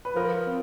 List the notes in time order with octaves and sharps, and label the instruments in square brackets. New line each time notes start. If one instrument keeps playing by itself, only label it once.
[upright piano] B4
[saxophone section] F3 [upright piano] A#4
[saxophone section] C4